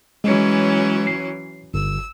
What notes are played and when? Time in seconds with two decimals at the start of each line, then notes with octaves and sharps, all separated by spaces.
0.24 E3 F#3 G#3 C#4
1.07 C7
1.74 G1 E6